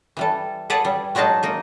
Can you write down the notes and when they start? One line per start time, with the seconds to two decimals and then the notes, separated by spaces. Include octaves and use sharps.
0.17 E3 G3 A4
0.70 G#4 A4 B4 D5 F#5
0.85 G3
1.15 F#3 G#3 D4 D#4 A5
1.43 A#3 D#4